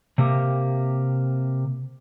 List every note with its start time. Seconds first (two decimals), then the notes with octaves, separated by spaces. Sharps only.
0.18 C3 A#3 G4